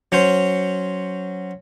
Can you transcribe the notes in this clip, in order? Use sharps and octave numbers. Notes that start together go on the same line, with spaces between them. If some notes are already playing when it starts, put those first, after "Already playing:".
F#3 C#4 C5